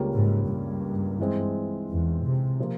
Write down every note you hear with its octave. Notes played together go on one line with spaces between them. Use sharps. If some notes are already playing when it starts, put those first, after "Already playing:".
Already playing: C#2 C#3 G3 A#3 C#4
G#2
G2
E3 G#3 C4
E2
C3
C3 F3 A#3 F4